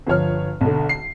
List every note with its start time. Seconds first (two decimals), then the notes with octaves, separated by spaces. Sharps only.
0.07 G1 F3 C#5 F6
0.61 B1 D3
0.89 C7